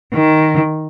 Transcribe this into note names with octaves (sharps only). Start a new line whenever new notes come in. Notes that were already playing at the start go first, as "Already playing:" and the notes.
D#3